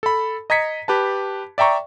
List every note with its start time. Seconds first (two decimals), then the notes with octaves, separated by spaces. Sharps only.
0.03 A4 B5
0.50 D#5 A#5 G#6 B6 C#7
0.88 G4 B4 A5
1.58 D5 E5 G5 A#5 C#6